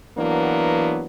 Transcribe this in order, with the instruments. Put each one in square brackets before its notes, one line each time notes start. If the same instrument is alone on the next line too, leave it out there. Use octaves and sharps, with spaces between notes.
[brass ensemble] E3 F#3 A#3 B3 D4